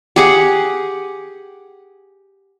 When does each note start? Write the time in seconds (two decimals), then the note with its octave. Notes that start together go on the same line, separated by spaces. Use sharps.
0.16 G4 G#4 F#5